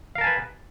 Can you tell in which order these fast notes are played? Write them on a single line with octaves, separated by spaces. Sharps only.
F5 A#4 A5 G#5 B4